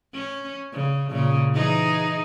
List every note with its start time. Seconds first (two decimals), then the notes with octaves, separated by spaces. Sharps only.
0.13 C#4
0.73 C#3
1.10 A#2 C#3
1.54 E3 D#4 G#4